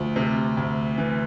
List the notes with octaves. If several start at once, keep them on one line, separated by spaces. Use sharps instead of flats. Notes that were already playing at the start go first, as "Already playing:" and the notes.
Already playing: D2 F3
C3
D2
E3